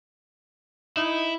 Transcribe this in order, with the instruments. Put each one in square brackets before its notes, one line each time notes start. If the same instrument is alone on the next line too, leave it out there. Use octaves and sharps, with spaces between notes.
[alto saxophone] D#4 [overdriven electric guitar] E4